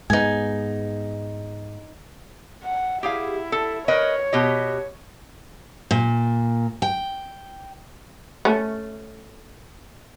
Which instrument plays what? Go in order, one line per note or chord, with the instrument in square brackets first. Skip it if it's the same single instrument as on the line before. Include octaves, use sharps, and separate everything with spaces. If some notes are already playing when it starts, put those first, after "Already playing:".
[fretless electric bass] G#2 G#3 B3 [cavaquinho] D#4 G#5
[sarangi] F#5
[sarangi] E4 [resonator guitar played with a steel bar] G4 G#4 F5
[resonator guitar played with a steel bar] A4
[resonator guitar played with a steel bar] A#4 B4 D#5 [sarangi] C#5
[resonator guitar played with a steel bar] B2 G4 D#5
[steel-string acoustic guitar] A#2
G5
[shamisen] A3 C#4